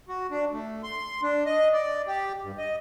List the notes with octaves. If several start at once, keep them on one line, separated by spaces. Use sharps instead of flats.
F#4
D4
A3
C6
D4
D#5
D5
G4
G2
D#5